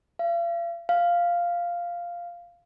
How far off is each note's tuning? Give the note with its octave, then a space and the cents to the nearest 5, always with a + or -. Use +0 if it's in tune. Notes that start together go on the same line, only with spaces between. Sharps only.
F5 -40
F5 -5